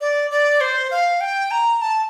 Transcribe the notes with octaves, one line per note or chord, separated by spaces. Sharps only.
D5
D5
C5
F5
G5
A#5
A5